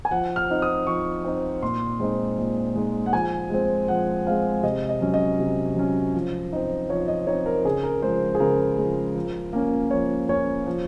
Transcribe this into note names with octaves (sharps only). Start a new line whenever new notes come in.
G#5
F3 F#5
F6
C4 D#4
D#6
F3 C#6
C4 D#4
A#2 C6
G#3 C4 D#4
A#2
G#3 C4 D#4
F#5
F3 G#5
G#3 C4
F3 F#5
G#3 C4 F5
C3 D#5
D#5
F#3 C#4
D#5
C3
F#3 C#4
F3
C4 D#4
F3 C#5
D#5
C4 D#4 C#5
A#4
C#3 G#4
A#4
F3 G#3 C5
G#4
C#3 A#4
F3 G#3
F3
A#3 C#4
F3 C#5
A#3 C#4 C#5
F3